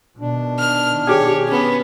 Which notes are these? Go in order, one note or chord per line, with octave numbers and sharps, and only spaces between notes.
B2 D#3 D4
F6
G4 G#4 C#5
B3 C#4